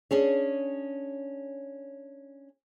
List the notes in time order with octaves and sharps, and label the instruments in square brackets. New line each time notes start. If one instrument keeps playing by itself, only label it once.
[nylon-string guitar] C#4 D4 G#4 C#5